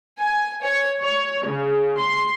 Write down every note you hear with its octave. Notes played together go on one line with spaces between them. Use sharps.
G#5
C#5
C#5
C#3
C6